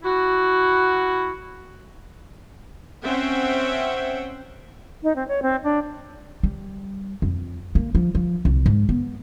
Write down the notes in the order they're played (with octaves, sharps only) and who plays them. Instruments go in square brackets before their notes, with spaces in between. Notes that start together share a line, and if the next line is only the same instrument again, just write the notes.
[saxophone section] E4 F#4
[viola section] C4 C#4 C5 E5 F#5 G5
[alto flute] D#4
C4
C#5
C4
D4
[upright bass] G3
F2
A#3
F3
F3
C2
G#2
B3